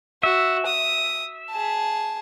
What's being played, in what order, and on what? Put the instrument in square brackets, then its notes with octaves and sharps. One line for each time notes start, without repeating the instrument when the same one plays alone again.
[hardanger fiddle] F#4 [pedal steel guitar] E5
[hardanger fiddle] D#6
G#4 A5